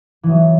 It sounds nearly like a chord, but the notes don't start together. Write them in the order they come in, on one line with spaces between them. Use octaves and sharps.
E3 B3 F#3